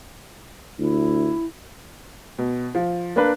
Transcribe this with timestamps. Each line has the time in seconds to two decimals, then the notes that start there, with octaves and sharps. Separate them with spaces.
0.79 D2 E4
2.38 B2
2.75 F3
3.16 A#3 D4 B4